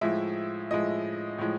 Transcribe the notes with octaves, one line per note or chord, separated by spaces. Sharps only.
A2 F3 G#3 E5
A2 F3 G#3 D#5
A2 F3 G#3